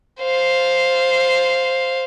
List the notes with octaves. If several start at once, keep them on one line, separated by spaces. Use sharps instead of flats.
C5 F5